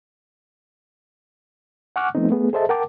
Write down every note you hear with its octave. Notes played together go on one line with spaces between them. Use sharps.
F#5 G#5 C#6 D6 F6 F#6
F3 A3 B3 C4 D#4
A3 B3 G#4
G#4 A4 C5 D#5 E5 A5
A#4 F#5 G5 A5 D6